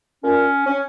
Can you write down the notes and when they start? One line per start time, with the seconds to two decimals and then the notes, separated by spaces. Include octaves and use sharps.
0.23 A#2 C#4
0.66 C#4